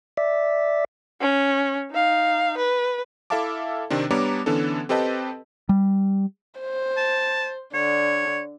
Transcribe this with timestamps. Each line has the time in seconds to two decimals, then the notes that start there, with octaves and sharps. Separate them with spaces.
0.17 D5 E5
1.21 C#4
1.91 D#4 F5
2.57 B4
3.30 E4 A4 E5 F5 A5 D6
3.90 C3 D#3 C4 D4
4.10 G3 B3 D4 C#5 A#5 D6
4.46 D3 E3 B3 C#4 D4 A4
4.89 C4 G4 A4 B4 D#5 A5
5.69 G3
6.60 C5
6.97 A5
7.74 D3 C#5